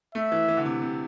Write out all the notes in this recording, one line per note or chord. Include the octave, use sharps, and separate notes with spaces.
A3 E5
E3
E3
D3
C3
C3